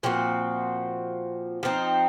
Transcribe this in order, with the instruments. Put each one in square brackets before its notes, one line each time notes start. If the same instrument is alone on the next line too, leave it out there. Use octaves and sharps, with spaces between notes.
[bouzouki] A#2 F3 C4 F#4
F3 C4 D#4